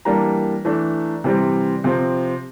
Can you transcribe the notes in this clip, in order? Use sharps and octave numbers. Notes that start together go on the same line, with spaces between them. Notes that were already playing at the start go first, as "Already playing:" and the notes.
E3 G3 A#3 D4 A#5
E3 A3 D4
C3 E3 G3 C4
C3 F3 C4